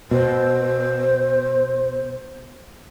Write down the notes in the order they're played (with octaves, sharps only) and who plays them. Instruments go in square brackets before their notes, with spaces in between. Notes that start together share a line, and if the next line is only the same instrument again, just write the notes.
[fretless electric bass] B2 [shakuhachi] C5